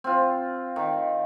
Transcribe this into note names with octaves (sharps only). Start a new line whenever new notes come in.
C4 F4
D#3